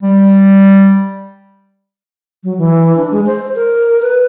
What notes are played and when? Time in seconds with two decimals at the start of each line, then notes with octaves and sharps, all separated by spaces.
0.03 G3
2.44 F#3
2.58 E3
2.97 D4
3.12 G#3
3.26 C5
3.55 A#4
4.02 B4